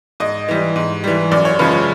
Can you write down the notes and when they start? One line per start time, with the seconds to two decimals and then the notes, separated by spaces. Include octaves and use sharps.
0.20 G#2 D#5
0.48 E3 G3
0.76 G#2
1.04 E3 G3
1.31 F#2 D5
1.45 C#5
1.59 C#3 F3 G#3 B4